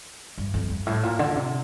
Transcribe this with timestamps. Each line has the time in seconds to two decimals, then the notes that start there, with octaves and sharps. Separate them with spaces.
0.38 G2
0.54 F2
0.70 G2
0.87 A2
1.03 A#2
1.19 D3
1.36 C3